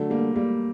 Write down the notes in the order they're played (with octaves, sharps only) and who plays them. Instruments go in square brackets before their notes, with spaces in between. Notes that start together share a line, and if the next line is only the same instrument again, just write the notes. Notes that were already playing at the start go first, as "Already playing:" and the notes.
Already playing: [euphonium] D3 [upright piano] F#3 A3
[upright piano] G3 A#3
G3 A#3